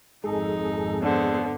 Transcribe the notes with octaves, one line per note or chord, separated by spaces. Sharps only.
G#1 F2 G#3 D#4 G#4 A4
D3 B3 C5